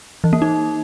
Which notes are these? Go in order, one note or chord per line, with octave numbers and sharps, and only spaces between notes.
E3
A#3
D#4